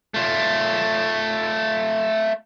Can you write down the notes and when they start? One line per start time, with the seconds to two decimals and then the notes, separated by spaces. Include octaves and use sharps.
0.14 A3 F4